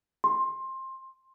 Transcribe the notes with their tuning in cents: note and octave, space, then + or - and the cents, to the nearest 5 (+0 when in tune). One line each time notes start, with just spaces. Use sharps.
C6 +20